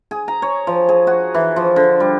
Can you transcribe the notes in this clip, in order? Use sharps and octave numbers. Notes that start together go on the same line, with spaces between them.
G#4
A#5
C#5
F3
G#4
F#4
E3
F3
D3
G3